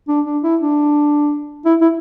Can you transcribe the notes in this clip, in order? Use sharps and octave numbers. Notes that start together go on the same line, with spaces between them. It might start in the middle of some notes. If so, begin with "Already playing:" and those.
D4
D4
E4
D4
E4
E4